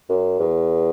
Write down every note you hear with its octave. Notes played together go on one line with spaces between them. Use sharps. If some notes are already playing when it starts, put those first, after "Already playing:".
F#2
E2